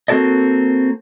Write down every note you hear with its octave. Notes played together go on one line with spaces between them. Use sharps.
A#3 C4 F#4 A4 D5 D#5